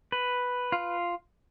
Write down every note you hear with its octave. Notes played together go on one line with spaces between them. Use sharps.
B4
F4